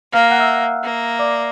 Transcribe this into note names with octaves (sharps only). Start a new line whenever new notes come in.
A#3 F5 F6
F#5 F#6
E5 E6
A#3
D5 D6